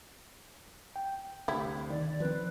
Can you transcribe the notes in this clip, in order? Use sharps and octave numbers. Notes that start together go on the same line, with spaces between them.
G5
D2 C3 G3 E4
D#3 D5
F3 C4 B4